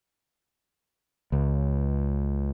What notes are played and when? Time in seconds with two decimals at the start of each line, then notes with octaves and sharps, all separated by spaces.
1.32 C#2